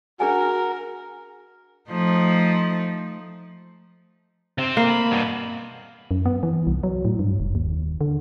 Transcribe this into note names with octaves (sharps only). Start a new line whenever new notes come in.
D4 F#4 G#4 A#4 G#5
F3 A3 D#4
C3 C4
A#3
B5
G2 B2
F#2
B3
E3
C2
F#3
A2
G2
F1
D#2
D3